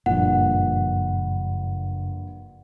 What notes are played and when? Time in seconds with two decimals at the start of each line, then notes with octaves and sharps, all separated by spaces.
0.06 F#1 G2 A#2 F3 F#5